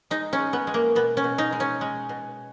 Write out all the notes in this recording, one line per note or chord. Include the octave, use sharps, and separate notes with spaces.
G#3 D#4
C#4
G#3
B3
G#3
A#3
B2 B3
C#4
B2
D#4
G#3
C#4
G#3
B2